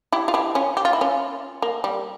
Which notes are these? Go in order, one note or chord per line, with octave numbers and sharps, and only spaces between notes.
E4 G4
F4
E4 G4
C#4 F4
G4
F4
E4
C#4 F4
A#3
G3